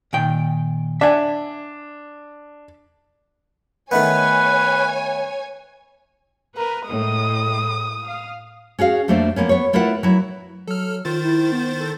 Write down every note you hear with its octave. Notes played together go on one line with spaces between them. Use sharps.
A#2 D#3 G5
D4 E5 F#5 G#5
D#3 A3 B3 B4 C#5 G#5
A#4 B4
A2 G#3 D#6
F5
C#4 F#4 G#4 F5
F2 G3 A3 A#3 D4 C5
F3 A#3 B3 C#4
B3 C#5
A3 E4 F4 A#4 B4 F#5
F#3 E4
F#3 A4 F6
D#3 F4 C5 A6
E4
B3
A4